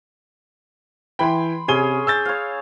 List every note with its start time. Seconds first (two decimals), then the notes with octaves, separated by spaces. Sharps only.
1.19 E3 G5 B5 C6
1.68 C3 C#4 G#4 C#5 D#7 G7
2.07 E6 G6 A6
2.25 C#5 F5